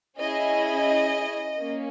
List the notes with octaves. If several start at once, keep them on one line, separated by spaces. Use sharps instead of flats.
C#4 E4 G#4 D#5
A#3 C#4